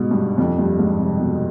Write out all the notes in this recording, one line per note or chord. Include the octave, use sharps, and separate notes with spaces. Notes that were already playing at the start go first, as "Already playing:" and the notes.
Already playing: G#2 B2 G3
G2
F2
G2
G#2
C3
B2